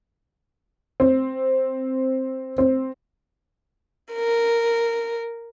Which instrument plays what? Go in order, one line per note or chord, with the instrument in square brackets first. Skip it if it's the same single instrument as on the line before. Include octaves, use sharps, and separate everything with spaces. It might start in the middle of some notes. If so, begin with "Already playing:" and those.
[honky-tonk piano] C4
C4
[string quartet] A#4